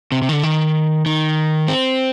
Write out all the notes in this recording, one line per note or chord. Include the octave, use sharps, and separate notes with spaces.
C3
C3
D#3
D3
D#3
D#3
C4